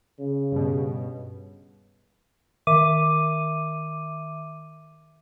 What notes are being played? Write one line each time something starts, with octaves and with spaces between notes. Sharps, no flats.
C#3
G2 B2
D#3 E5 D6 D#7